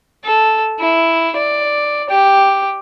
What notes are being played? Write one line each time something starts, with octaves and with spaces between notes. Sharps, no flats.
A4
E4
D5
G4